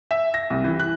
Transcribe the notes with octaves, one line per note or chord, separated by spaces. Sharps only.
E5
A#6
C2
E3
F#6